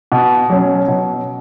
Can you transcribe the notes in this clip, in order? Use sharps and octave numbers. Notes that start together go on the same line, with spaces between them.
B2
F#3 C#4
B2